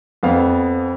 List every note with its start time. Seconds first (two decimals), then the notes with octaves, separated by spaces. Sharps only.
0.23 F2 B3 F5